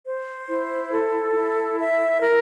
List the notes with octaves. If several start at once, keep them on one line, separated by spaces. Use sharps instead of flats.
C5
E4
A4
E4
E5
A#4